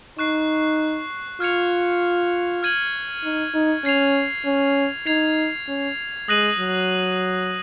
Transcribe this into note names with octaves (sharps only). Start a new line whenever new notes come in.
D#4 C#6 F#6 C7
F4 F6 G#6 C#7 F7
F6 G#6 D#7 F#7
D#4
D#4
C#4 G#6 C7 F7
C#4
D#4 G#6 C7 F7
C#4
G#3 D#6 F#6 A#6 D#7 F#7
F#3